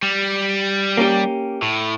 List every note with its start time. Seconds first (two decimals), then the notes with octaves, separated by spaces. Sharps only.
0.03 G3
0.97 A#3 C#4 G4
1.62 A2